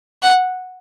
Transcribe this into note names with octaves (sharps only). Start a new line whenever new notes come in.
F#5